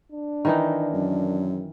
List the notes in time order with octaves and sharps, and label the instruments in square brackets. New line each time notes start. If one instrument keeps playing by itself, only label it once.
[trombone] D4
[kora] D#3 E3 D#4
[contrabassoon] F#2